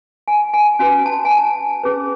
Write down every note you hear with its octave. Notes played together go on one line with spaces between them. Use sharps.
G#5
G#5
C#4 F#4 B4 G#5
A5
G#5
A5
C#4 G#4 B4